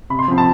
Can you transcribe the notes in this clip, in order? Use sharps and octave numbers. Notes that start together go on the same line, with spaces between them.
C3 B5
C6
F3 C4
A5